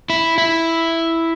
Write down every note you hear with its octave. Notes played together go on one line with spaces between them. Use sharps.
E4
E4